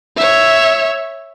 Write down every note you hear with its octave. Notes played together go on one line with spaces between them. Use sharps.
C#5 E5